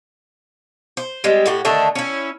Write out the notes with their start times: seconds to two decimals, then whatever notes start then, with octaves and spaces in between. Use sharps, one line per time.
0.97 C5
1.24 G3 G#3 C4
1.46 A2 F#4 G4
1.65 D3 D#3 A3 D4
1.95 C#4 E4